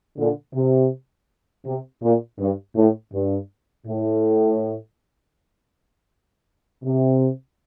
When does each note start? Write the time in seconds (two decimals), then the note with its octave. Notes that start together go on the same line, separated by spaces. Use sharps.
0.17 A#2 D3
0.54 C3
1.65 C3
2.03 A#2
2.39 G2
2.76 A2
3.13 G2
3.87 A2
6.83 C3